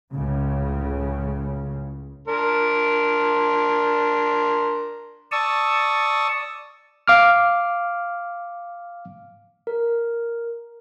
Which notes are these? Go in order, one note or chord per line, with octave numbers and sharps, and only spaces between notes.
C#2 A2 C#3
D4 A#4 C6
D5 A5 C#6 D#6 E6
F5 D6 F6
A#4